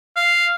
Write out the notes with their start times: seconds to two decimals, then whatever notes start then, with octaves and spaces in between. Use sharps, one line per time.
0.16 F5